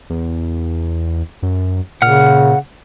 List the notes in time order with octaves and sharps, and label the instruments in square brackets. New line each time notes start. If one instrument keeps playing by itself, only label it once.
[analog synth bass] E2
F#2
[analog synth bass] A#2 [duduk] C#3 [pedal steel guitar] F#5 F6